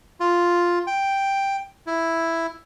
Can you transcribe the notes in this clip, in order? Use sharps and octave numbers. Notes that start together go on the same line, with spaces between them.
F4
G5
E4